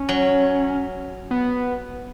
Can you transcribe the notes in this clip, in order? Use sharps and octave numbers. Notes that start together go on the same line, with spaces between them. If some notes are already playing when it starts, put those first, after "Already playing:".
Already playing: C#4
F#3
B3